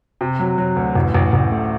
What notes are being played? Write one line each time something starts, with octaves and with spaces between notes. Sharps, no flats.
C3
F#3
F#3
D2
A1
A1
A1
A3